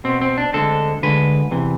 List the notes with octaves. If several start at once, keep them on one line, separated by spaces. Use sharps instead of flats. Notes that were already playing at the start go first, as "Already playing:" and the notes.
B2 B3 C4
C4
D4
D2 D3 G#3 C4 A4
D2 D3 G#3 B4
E2 C3 E3